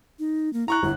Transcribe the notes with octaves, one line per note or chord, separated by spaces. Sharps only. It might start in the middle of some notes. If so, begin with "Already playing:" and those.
D#4
A#3
E4 A#5 C#6 F#6
G1 E4